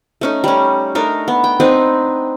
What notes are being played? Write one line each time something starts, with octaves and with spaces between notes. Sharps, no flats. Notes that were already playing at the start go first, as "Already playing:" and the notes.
A3 C#4 D#4
G3 C#4
A3 D4 D#4 A#4
B3
G5
C4 D4 D#4 B4